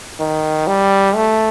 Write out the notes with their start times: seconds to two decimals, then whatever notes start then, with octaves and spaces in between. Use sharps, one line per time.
0.20 D#3
0.67 G3
1.15 A3